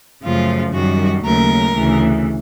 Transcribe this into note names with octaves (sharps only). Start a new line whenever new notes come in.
F#2 C#3 F3 A3 F4
F#2 D#3 G3 F#4
D#2 C#3 F#3 A3 A#4
D2 C#3 E3 A3